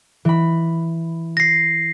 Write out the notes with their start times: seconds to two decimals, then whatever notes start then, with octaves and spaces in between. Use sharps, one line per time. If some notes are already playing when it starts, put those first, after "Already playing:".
0.25 E3 B5
1.37 A#6 C7